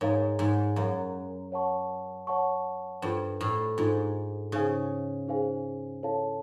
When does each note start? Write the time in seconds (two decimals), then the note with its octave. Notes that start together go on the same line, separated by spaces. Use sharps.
0.01 G#2 A#4 C#5 F5 A#5
0.39 G#2
0.76 F#2 A#4 C#5 F5 A#5
1.52 C#5 F#5 A5 C#6
2.27 C#5 F#5 A5 C#6
3.02 G2 D4 F4 A4 C5
3.41 A2
3.78 G#2 D4 F4 A4 C5
4.52 C#3 D#4 G#4 C5 F5 G#5
5.27 D#4 G#4 C5 F5 G#5
6.03 E4 A4 C#5 F5 A5